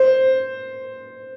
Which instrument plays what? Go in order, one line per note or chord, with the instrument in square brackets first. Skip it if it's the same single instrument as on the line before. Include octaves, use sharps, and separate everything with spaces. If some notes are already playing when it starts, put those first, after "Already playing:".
Already playing: [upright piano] C5